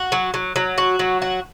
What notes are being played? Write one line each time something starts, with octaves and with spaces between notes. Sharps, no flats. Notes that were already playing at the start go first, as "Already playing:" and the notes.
Already playing: F#4
F#3
F#3
F#3
F#4
F#3
F#4